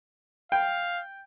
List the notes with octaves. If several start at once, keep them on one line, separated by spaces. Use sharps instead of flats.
F5 G5